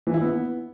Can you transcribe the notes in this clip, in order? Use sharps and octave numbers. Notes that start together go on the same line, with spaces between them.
E3
E4
B3